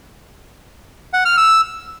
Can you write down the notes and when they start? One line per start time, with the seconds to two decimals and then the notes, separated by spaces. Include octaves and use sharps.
1.13 F#5
1.25 F6
1.37 E6